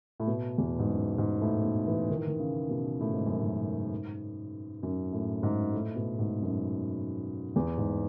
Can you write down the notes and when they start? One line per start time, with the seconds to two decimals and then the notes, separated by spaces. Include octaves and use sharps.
0.20 A2
0.27 B2
0.58 E2
0.79 G#2
0.88 F#2
1.18 G#2
1.41 A2
1.65 B2
1.87 E3
2.10 D#3
2.18 E3
2.28 D#3
2.40 C#3
2.70 B2
3.00 A2
3.13 G#2
3.26 F#2
3.40 G#2
4.83 F#2
5.13 A2
5.43 G#2
5.74 A2
5.96 B2
6.19 G#2
6.42 F#2
7.56 E2
7.78 G#2